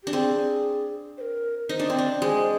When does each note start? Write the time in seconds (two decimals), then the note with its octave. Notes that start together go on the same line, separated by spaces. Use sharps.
0.03 D4 G4
0.13 C4 G#4
1.18 C5
1.21 A#4
1.69 D#4 C5
1.80 D4
1.90 C4
1.96 D4 D5
2.22 G#3 C5